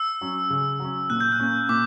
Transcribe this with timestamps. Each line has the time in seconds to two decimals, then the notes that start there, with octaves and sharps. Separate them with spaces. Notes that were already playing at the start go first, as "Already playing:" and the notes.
Already playing: E6
0.21 F#3 C#4
0.50 C#3
0.80 F#3
0.85 C#4
1.10 A#2 F#6
1.20 G6
1.32 F#6
1.40 A#3 C#4
1.69 A#2 D6